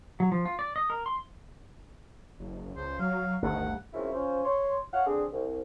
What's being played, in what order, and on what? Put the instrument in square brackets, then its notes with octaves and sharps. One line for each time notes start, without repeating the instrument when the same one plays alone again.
[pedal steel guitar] F#3
F3
F4
D5
D#5
A#4
C6
[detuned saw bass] F#1
[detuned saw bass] C#2 [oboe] C5
[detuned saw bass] F#3 [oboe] F5
[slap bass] G1 D2 [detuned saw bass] D#3 [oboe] F#5
[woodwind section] C#2 F#2 C#3 C4 E4
C#4 F4 C5
C#5 C6
C#5 F5 F#5
D3 C4 D4 G#4
C2